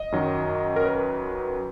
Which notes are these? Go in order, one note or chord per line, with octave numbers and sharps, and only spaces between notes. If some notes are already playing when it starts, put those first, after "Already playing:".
Already playing: D#5
F#2 D#3 F#3
A#4
B4